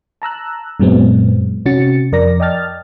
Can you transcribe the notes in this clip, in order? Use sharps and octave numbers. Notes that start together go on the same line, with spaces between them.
A5 A#5 E6 F#6
F#2 A#2 F#3 G#3 B3 C4
C3 C#4 F#4 A6 C#7
F2 A#4 D5 A#5 A#6
D5 D#5 G5 A5 F6 A6